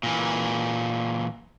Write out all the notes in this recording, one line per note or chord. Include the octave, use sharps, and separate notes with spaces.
A#2 E3